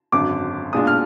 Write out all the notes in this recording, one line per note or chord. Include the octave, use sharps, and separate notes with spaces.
G#1 F#2 D3 F#3 D6
B1 A#2 G#3 D4 F4 D#6
F6